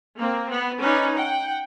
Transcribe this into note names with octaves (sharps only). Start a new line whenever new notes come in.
A#3 C4
B3
C#4 D#4 B4 D5
F#5 G5